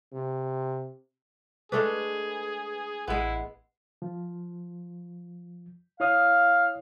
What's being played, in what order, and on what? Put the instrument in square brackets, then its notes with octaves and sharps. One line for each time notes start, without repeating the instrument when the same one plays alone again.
[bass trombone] C3
[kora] G#3 A3 D4 [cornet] G#4 [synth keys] B4
[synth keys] A1 [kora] G#3 B3 [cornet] E4
[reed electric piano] F3
[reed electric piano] E4 C#5 D#6 [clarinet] F5